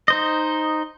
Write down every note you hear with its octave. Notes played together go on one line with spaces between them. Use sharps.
D#4 C5 D#5